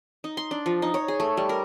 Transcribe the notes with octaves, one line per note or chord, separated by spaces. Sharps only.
D#4
C6
D4
F3
D#4
C#5
G#4
A3
G3
A#4